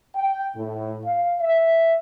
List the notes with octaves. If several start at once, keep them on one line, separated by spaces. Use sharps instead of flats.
G5
A2
F5
E5